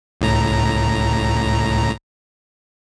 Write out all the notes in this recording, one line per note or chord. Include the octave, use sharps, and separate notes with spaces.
C#2 A2 A#5